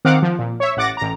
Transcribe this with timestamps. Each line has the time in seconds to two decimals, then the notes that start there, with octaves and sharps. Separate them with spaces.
0.05 D#3 C4 F5 F#5 D6
0.22 F3
0.39 A#2
0.60 C#5 E5
0.77 A1 F#5 D6 A6 A#6
0.97 A1 A#5